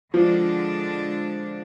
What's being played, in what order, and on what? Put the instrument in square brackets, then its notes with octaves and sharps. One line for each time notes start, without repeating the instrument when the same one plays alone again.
[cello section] D3 G#3 D4 [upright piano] F3